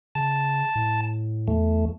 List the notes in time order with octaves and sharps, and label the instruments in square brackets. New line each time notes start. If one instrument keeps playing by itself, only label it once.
[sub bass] C#3 [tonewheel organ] A5
[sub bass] A2
[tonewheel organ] E2 A3